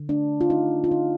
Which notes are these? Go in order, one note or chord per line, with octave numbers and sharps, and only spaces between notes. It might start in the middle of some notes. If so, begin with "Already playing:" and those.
Already playing: D3
A3 D4
F4
A3 D#4
F4
D3 D#4